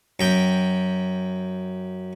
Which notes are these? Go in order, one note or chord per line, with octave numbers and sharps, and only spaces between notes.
F#2 G5